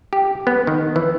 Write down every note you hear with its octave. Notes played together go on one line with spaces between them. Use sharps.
G4
B3
D#3
E3